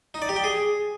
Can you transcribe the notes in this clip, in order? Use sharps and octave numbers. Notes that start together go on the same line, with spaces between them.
D#4
D5
G4
G5
G#4